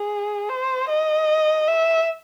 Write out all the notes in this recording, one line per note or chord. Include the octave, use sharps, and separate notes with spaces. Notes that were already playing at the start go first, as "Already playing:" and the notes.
Already playing: G#4
C5
D#5
E5